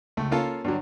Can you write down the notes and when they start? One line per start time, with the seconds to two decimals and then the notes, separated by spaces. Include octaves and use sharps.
0.17 C#2 A3
0.31 A#3 C#4 F4 A4
0.64 G2 D3 F#3